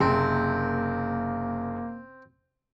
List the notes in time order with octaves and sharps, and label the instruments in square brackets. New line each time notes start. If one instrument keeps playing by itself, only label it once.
[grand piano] F#1 C3 [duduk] A#3 [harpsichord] C4